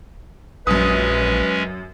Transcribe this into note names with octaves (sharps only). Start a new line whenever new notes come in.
A#1 F#2 G#3 C#4 B4 D#6